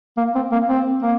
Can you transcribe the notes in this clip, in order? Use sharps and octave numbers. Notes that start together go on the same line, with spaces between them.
A#3
C4
A#3
C4
A#3